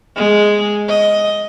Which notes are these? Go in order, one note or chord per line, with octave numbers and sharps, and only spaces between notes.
G#3
D#5